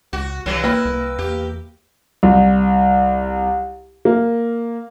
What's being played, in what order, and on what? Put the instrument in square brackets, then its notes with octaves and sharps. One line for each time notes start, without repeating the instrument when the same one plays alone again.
[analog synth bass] C#2 [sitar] F#4
[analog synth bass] C2 [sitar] G2 E3 F#3
[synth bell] A#3 [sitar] E4 [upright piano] B4 G5
[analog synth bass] C2
[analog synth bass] E2 [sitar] G4
[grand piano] C2
A#3